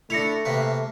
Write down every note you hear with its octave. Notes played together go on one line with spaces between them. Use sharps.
A3 D4 E4 A#6 C#7 F7
C3 A#3 B4